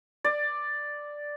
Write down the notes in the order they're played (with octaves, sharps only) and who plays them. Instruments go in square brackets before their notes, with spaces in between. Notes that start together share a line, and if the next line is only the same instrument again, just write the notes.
[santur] D5